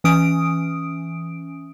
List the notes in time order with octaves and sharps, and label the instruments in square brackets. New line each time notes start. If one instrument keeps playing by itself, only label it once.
[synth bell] E3 C#4 D#6 D7